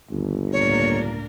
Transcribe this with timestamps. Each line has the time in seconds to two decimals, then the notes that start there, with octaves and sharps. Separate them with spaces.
0.10 G1 D#2
0.52 C#2 A2 A#3 D4 A#4 C#5